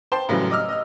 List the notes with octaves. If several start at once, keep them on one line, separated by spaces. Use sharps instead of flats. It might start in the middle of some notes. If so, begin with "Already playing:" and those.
C5 G5 A5 C6
F#2 A2 C#3 E3 F#3 G3
D#5 D6 E6 F6
D#5 F6